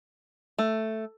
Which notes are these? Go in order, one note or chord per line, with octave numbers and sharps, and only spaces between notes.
A3